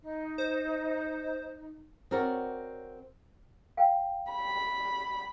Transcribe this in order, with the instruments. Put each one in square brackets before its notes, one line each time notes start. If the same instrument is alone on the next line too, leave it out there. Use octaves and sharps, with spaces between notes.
[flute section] D#4
[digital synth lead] C5
[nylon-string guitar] C4 F#4 A#4 C#5 D5
[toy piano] F5 G5
[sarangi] B5